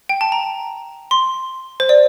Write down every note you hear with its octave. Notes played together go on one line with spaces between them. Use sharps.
G5
A5
A#5
C6
C5
D5